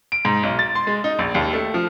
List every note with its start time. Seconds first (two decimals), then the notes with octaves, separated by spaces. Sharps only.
0.12 D7
0.25 G#2
0.43 B1
0.59 A6
0.75 C6
0.87 G#3
1.04 D#4
1.19 A#1
1.35 D#2
1.53 A3
1.74 F3